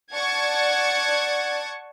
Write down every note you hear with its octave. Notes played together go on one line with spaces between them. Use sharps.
D5 F#5 A5 C#6 G#6